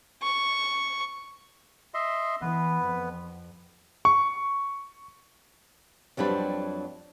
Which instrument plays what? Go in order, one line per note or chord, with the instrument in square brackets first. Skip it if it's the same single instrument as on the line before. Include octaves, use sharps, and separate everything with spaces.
[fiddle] C#6
[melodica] D#5 E5 C6
[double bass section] E3 [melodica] B3 B4
[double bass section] F2
[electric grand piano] C#6
[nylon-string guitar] F2 F#3 G3 D4 B4